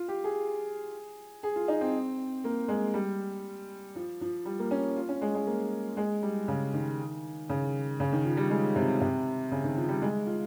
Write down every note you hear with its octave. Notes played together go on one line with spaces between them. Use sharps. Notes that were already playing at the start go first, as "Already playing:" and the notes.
Already playing: F4
G4
G#4
G#4
F4
D#4
C4
A#3
G#3
G3
F3
F3
G3
A#3
C#4
F4
C#4
G#3
G#3
A#3
G#3
G3
C#3
D#3
C#3
C#3
D#3
F3
G3
G#3
C3
C3
C#3
D#3
F3
G3
G#3
F4